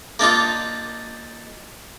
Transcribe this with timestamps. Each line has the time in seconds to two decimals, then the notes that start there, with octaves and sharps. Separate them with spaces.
0.19 A#3 D4 D#4 F4